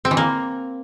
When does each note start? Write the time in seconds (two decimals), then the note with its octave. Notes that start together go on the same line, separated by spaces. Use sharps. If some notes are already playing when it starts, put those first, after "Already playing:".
0.05 C4
0.11 E3
0.17 A#3